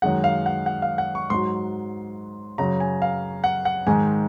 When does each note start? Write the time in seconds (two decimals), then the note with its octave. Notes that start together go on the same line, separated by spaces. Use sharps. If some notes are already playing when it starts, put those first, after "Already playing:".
0.02 F#2 D#3 G#3 F#5
0.24 F5
0.46 F#5
0.66 F#5
0.82 F5
0.98 F#5
1.15 C#6
1.30 G#2 F#3 C6
2.58 F#2 C#3 F#3 A#5
2.80 G#5
3.02 F5
3.44 F#5
3.65 F#5
3.87 G#2 D#3 G#3 G#5